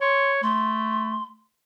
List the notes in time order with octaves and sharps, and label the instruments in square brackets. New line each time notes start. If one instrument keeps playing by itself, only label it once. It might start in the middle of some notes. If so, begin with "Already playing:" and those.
[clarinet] C#5 [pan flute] C6
[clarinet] A3 [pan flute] C6